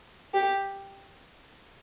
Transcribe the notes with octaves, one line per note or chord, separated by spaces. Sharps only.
G4